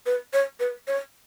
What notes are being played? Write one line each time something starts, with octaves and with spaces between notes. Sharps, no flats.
B4
C#5
B4
C#5